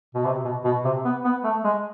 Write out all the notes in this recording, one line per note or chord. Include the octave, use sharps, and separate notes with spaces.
B2
C3
B2
B2
C3
B3
B3
A3
G#3